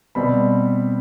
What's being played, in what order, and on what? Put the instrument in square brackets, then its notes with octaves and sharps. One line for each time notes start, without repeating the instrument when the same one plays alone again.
[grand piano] B2 G3 C4 B5